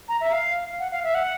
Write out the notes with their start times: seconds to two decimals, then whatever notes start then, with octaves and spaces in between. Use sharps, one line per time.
0.09 A#5
0.21 E5
0.32 F5
0.79 F#5
0.91 F5
1.04 E5
1.15 F#5